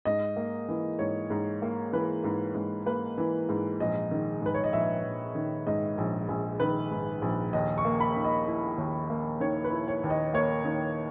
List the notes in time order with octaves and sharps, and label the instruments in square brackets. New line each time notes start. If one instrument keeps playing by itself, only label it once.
[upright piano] G#2 D#5
A#3
E3
G#2 C#5
G#2
A#3
E3 B4
G#2
G#2
A#3 B4
E3
G#2
A#1 D#5
D#3
G#2 B4
C#5
D#5
A#1 E5
A#1
D#3
G#2 D#5
A#1
A#1
D#3 B4
G#2
A#1
D#2 D#5
C#6
A#3
B5
D#3
D#5
E4
D#2
A#3
D#3 C#5
B4
E4
C#5
D#2
D#5
A#3 C#5
D#3